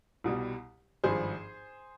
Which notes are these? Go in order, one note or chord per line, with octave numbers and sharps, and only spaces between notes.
C2 B2 G3
G#1 G2 F3 G#4 C5